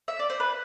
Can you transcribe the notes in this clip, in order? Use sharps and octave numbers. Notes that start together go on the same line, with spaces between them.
E5
D5
C5
B4